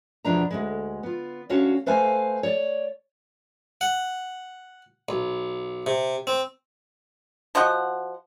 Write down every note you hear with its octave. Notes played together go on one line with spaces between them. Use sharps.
E2 B2 F3 D4 B4 A#5
D2 C3 G#3
B3 F4
D2 C#4 D4 F#4 C#5 F5
A3 B4 C5 F5 G#5
C#5 D5
F#5
B1
C3
C4
F3 F#4 D#5 F#5